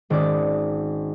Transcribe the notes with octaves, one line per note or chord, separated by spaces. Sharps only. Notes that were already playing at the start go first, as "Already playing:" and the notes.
G#1 C#4 D5 D6 D#6